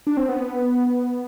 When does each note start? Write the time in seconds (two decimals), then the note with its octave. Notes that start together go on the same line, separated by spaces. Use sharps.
0.07 D4
0.17 C4
0.29 B3